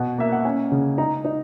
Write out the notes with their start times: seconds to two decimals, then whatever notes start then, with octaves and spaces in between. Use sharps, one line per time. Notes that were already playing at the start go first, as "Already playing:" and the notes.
Already playing: B2 F#5
0.18 A#3 E5
0.32 F#5
0.45 C#4 G#5
0.72 C#3
0.98 D#4 A#5
1.25 D#4